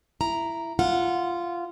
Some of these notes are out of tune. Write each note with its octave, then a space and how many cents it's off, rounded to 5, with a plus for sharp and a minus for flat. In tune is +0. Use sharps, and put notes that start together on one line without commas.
E4 +15 A#5 +0
F4 -15 F#5 -25